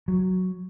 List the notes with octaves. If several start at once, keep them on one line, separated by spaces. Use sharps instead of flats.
F#3